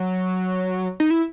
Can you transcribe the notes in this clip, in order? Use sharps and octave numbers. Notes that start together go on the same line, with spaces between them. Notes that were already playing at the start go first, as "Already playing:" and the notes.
Already playing: F#3
D#4
E4